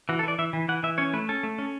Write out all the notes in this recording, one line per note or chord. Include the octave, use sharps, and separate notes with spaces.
E3 F#4
A4
E3 D5
E3 E5
E3
E3 F#5
E3 E5
C#4 C#5
A3 B4
C#4 A4
A3
C#4